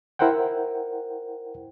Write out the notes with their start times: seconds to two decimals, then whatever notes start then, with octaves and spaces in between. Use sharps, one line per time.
0.19 E4 A#4 C5 F#5 G5